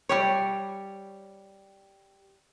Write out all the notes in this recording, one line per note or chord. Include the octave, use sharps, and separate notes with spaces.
G3 G4 C#5